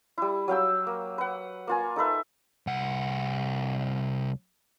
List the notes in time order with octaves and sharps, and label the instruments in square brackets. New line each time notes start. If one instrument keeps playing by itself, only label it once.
[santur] G3 E4
F#3 F5 G5 E6
A#3
B4 F#5
A#3 F4 G#5
D#4 A4 B4 E5
[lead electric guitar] C2 F#5